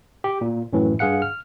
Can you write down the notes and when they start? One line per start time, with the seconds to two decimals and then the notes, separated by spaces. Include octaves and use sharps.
0.24 G4
0.41 A#2
0.73 F#2 A2 E3
0.99 G2 G#4 F5 F#5 C#7
1.22 F6